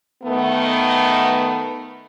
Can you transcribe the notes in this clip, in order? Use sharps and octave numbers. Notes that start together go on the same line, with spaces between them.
D#3 A3 B3